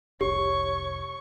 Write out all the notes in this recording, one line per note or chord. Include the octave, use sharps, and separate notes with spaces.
F1 C2 G4 C#5 C#6